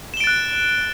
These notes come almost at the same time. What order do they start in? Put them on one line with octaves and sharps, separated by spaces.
E7 G7 D7 A6 F#6